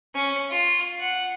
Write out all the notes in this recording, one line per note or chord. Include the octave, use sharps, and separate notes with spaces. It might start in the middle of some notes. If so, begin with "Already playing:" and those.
C#4
F4
F#5